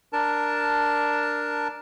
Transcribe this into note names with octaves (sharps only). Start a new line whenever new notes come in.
D4 A#4 A5